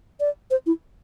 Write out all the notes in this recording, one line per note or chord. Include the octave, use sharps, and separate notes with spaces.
D5
C5
E4